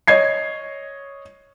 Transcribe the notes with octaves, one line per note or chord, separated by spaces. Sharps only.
C#5 D#5 G#6 C7